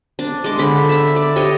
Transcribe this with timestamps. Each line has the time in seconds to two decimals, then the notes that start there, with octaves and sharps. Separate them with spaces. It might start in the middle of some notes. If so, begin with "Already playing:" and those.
0.19 D4
0.44 G#3 D6
0.59 D3 B5
0.89 E5 B5
1.16 D5
1.36 G4 C#5 D#5